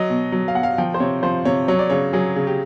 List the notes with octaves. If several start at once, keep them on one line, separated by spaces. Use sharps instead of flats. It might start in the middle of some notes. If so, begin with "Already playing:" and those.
Already playing: F#3 D#5
B2
F#3
F5
B2 F#5
F5
F3 G5
C5
C3 C#5
F3 C5
C3 C#5
F#3 C#5
D5
C#3 C#5
F#3 G#4
C#3
G4